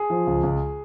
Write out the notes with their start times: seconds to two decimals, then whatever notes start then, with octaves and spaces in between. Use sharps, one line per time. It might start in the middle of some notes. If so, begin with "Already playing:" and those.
Already playing: G#4
0.10 F3
0.27 C#2
0.43 C#2